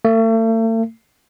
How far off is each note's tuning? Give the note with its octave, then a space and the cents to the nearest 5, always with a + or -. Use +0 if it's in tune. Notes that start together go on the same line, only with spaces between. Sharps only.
A3 +40